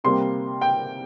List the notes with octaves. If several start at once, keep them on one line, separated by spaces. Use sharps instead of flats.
C3 G3 A#3 C6
G5